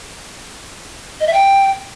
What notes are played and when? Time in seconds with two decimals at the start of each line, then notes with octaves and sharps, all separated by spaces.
1.20 D#5
1.27 E5
1.33 G5